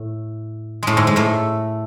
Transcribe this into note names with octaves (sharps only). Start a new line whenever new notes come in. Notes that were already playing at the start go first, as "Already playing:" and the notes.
Already playing: A2
A2 G#3 A3
G#2 G#3
G#2 G#3
A2 A3